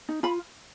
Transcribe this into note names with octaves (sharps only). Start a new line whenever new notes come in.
D#4
F4 B5